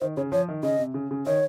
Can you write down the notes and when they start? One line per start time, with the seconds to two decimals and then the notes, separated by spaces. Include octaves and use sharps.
0.01 D#3 C5
0.17 C#3 C#5
0.32 F3 C#5
0.49 D#3
0.63 C#3 D#5
0.79 C3
0.94 C#3
1.11 C#3
1.26 D#3 C#5